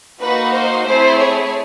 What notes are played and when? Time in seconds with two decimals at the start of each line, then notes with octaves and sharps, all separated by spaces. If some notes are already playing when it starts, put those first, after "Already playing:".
0.20 A#3 D#4 F#4 B4
0.53 C5
0.86 A3 C4 E4 G#4 C5
1.19 C#5